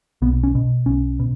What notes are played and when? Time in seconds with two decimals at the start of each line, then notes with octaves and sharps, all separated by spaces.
0.22 B1 B3
0.44 C#4
0.55 B2
0.86 B1 C#4
1.19 B2